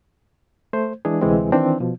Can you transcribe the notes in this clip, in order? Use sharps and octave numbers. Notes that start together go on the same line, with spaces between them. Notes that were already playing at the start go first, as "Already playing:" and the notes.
A3 C5
E3 G#3 D4 G#4
D2 C3 E3 G#3 C4
D#3 E3 C4 D4
B2 F3